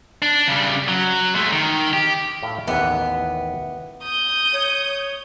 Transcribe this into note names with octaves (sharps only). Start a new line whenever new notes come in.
D4
C#3 G3
F#3
G#3 A3
D#3
G4
A2 A4 F5
A1 D#2 E3 B3
D#6 G6
C#5